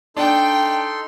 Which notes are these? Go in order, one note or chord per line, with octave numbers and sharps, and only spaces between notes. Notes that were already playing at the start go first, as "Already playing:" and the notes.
D4 D#4 A4 G5 C6